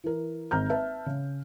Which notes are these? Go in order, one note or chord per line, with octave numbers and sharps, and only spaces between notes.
E3 A#4
G#1 A#5 F6 G6
B4 E5 A5
C#3